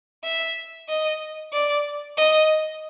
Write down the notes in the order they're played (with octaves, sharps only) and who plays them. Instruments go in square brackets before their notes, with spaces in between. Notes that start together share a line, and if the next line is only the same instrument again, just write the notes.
[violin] E5
D#5
D5
D#5